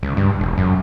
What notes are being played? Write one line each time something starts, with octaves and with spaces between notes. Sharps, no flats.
C#2
G2
E1
F#2